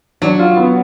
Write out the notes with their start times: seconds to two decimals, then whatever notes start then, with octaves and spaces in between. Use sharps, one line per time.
0.22 F#3 D4
0.39 F4
0.57 B3